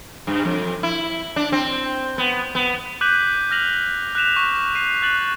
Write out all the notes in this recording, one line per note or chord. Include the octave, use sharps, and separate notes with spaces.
G2
F2
E4
D4
C4
B3
B3
D6 F#6 G6 B6 D#7 F#7
F6 A#6 F7 F#7
F#6 B6 E7 F7
C#6
C7 D#7
F#6 A6 F#7